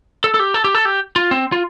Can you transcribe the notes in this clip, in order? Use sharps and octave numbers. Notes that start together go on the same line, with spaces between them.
A4
A4
G4
A4
G4
A4
G4
F4
C4
F4